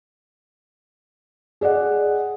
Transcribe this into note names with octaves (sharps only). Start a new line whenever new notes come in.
G#4 D5 D#5 F#5